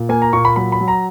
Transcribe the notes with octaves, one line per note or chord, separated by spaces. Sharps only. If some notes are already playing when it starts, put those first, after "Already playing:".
Already playing: A#2
A#3 G#5
A#5
A#2 C#6
B5
F#3 B5
B5
F#3
A#5